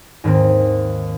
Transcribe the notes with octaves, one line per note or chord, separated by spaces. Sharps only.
D#2 G#2 D#3 C4